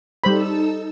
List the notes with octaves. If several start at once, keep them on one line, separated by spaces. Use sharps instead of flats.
G3 D#4 A4 C5 B5 E6